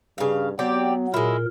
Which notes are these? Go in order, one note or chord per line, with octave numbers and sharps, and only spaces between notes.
G2 C#3 F5
F#3 B3 C4 G4 D5
A#2 G#3 E4 A#4